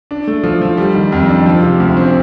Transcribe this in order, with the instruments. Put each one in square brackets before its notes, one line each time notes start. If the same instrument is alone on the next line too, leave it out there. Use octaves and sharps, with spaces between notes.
[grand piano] D4
A3
F3
F3
G3
D#3
F2
D4
F3
C3
D2
C4